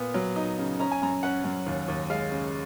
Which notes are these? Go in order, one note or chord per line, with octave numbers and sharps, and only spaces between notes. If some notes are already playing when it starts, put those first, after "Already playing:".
Already playing: A#2 B3
F#3
D#4
C#3
C#4 A#5
G#5
F#2 A#5
C#4 F#5
F#2
D#2
D#2
G#3 F5
C#3